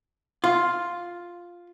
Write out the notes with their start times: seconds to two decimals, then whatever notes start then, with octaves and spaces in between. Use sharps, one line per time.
0.44 F4